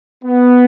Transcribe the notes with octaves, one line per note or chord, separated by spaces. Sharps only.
B3